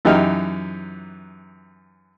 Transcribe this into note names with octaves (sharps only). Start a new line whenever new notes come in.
F#2 E3 D#4 G4 F6